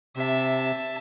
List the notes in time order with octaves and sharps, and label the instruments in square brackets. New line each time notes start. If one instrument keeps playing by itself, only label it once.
[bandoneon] C3 [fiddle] E5 A5